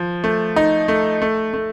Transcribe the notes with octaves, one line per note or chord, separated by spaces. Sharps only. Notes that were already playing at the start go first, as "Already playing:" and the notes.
Already playing: F3
A3
D#4
A3
A3
A3